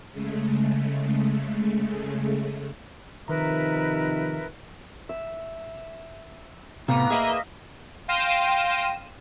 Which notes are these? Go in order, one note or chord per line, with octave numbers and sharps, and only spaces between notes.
C#3 G#3 A3
C3 D#3 F3 D#4 A#4 B4 E5 A#5
E5
A2 C3 B3 F5 A#5 D6
A#3 G#4 A4 B4 D#5 E5
F5 G5 C6 A#6 D#7 E7